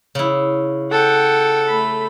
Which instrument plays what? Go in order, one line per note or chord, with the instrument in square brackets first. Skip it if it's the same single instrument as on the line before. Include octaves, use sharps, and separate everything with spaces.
[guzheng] C#3 E4
[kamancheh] A4 [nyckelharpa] F#5 G5
[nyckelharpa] A3 B5